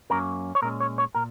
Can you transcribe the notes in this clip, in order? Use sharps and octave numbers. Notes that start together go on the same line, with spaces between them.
F#2 F#3 A#3 C#4 A#4
C#5
A#2 G#3 C#4 A#4
C#5
C#5
A#2 A#4